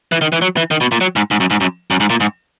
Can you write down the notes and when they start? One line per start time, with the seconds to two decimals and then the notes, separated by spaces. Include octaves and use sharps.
0.12 E3
0.21 D#3
0.32 E3
0.42 F#3
0.57 E3
0.71 D#3
0.81 B2
0.92 A#2
1.01 F#3
1.16 G#2
1.31 G#2
1.40 F#2
1.51 G#2
1.61 F#2
1.91 F#2
2.00 G#2
2.10 A#2
2.20 G#2